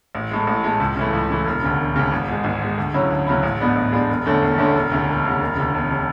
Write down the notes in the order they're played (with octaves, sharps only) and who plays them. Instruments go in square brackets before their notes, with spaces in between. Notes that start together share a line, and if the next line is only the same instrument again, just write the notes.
[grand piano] A1
A2 G#3
A1
A2 G#3
C#2
C#3 E3 A3
C#2
C#3 E3 A3
E1
D2 C#3
E1
D2 C#3
G#1
G#2 G#3
G#1
G#2 G#3
D2
C#3 F#3 C#4 E4
D2
C#3 F#3 C#4 E4
A1
G#2 G#3 B3 D4
A1
G#2 G#3 B3 D4
E1
E2 D3 A3 C#4
E1
E2 D3 A3 C#4
E1
D2 C#3
E1
D2 C#3
E1
D2 C#3
E1
C#3